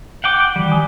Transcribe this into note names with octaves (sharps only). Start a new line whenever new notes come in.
F#5 G5 D6
D#3 E3 G3
G#5 D#6